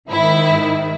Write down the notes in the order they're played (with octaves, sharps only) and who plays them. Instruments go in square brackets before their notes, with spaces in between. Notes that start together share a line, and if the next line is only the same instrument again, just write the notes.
[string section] G#2 D#3 E4